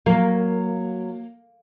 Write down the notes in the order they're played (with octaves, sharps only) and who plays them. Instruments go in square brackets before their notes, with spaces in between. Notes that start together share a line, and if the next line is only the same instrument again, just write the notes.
[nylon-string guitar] F#3 [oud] A#3